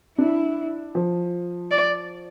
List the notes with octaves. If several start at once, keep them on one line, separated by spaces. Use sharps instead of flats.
D4 E4
F3
D5